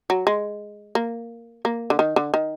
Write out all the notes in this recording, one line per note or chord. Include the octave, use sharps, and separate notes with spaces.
F#3
G#3
A#3
A#3
D3
D#3
D3
D#3